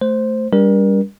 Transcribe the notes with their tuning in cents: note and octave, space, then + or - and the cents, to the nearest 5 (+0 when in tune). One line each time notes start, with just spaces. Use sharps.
A3 +0 C5 +0
G3 +20 D4 -35 A#4 +35